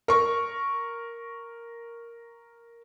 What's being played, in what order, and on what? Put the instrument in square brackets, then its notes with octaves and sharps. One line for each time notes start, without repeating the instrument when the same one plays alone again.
[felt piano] A#4 C#6